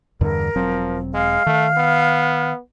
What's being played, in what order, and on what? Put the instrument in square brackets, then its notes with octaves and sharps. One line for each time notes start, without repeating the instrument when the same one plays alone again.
[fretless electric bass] E2 G2 D3 [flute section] A#4
[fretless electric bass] E1 F#3 C4 [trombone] F3
[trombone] G#3 [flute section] F5 F6
[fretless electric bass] D#3 [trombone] A3
[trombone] B3